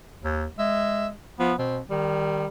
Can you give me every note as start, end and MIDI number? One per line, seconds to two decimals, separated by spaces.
0.24 0.46 39
0.59 1.11 56
0.59 1.07 76
1.39 1.53 53
1.39 1.55 59
1.59 1.79 47
1.59 1.79 60
1.90 2.46 51
1.90 2.48 55